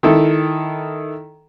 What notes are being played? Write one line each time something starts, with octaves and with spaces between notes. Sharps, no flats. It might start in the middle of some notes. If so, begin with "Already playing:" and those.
D#3 E4 A4